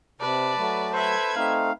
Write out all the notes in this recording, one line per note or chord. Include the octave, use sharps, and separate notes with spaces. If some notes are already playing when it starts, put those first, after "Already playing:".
C3 B4 D5 A5
F#3 A3
A4 B4 C5 E5 G#6
A3 C4 D#4 F5